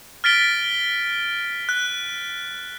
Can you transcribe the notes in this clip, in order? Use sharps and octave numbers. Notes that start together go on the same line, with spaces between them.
F6 A6 B6 D7 G7
F#6